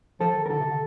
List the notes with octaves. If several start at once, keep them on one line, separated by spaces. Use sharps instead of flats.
F3 A4
D#3
A#4
D3 A4
C3
D3